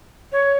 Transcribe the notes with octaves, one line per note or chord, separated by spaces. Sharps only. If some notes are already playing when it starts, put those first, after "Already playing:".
C#5